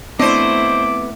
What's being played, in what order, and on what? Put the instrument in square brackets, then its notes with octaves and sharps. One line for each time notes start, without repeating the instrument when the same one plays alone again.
[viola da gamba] A3 E4 [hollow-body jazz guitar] B3 C4 D4 [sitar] C5 D#5 [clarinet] D6